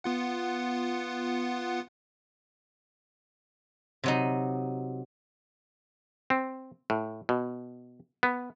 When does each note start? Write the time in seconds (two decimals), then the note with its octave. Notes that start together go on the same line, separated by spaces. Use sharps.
0.04 B3 F4 F#5
4.04 C3 F#3 D#4
6.30 C4
6.90 A2
7.29 B2
8.23 B3